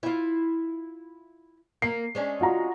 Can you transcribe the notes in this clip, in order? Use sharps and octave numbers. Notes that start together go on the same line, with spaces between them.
E4 F4
A#3 C7
G#3 C#4 D4
F4 F#4 A#5